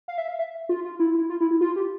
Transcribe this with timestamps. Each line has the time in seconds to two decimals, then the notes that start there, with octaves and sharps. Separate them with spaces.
0.08 F5
0.18 E5
0.28 F5
0.39 E5
0.69 F4
0.85 F4
0.99 E4
1.15 E4
1.30 F4
1.41 E4
1.51 E4
1.61 F4
1.76 G4